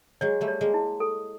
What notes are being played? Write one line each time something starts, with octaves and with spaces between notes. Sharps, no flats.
F#3 G#3 C#5
G3 A3
C#5
G#3 A#3
E4
A4